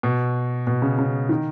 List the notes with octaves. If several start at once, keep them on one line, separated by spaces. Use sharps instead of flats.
B2
B2
C#3
C#3
D#3